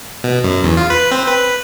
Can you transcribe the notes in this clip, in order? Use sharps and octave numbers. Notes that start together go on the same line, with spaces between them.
B2
F#2
E2
F4
B4
C4
B4